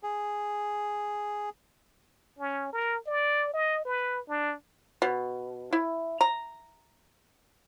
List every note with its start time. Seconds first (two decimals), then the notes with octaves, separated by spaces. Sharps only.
0.03 G#4
2.39 C#4
2.73 A#4
3.07 D5
3.54 D#5
3.85 B4
4.29 D4
5.02 B2
5.73 E4
6.21 A#5